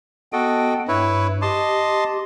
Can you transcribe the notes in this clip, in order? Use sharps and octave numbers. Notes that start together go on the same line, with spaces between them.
B3 F#4 A4 D#5 G5
G2 E4 B4 C#5
G4 D#5 A5 C6